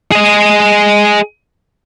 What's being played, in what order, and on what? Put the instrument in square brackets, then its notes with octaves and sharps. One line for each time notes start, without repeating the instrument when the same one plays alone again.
[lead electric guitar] G#4 D#5